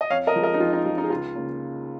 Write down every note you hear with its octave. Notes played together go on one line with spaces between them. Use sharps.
D#5
F2 C#5 F5
A#4 D#5
F3 G#3
A#4 D#5
D#4
F2 F4
D#4
F3 G#3 F4
D#4
G#4
C#2 F4
C#3 A#3